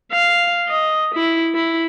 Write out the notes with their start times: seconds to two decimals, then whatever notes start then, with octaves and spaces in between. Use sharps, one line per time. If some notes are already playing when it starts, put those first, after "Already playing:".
0.12 F5
0.68 D#5
1.14 E4
1.55 E4